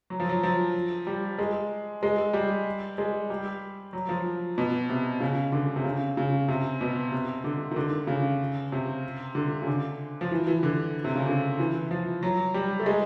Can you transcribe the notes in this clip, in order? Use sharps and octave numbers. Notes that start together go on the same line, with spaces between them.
F#3
F3
F#3
F3
G3
G#3
G#3
G3
G#3
G3
F#3
F3
B2
C3
C#3
D3
C3
C#3
C#3
C3
B2
C3
D3
D#3
D3
C#3
C3
D3
C#3
D3
F3
E3
E3
D3
C3
C#3
D3
E3
F3
F#3
G3
A3
G#3